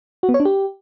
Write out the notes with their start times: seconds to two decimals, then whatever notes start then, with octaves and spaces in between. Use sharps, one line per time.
0.23 F#4
0.29 B3
0.34 C#5
0.40 D4
0.45 G4